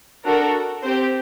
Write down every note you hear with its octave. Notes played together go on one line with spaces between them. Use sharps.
D4 F#4 A4 A#4
C4 G4 C5